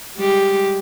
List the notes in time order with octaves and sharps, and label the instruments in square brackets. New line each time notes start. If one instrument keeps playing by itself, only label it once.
[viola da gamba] G3 G#3 G4